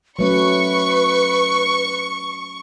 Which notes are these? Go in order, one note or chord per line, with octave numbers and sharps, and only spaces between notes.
F#3 A3 C#4 B4 C#6